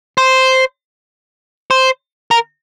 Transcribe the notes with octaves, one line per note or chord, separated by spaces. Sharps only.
C5
C5
A#4